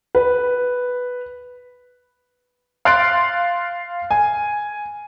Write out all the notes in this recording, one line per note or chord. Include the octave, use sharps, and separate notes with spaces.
B4
F5 C6 F#6 A6 D7
G#5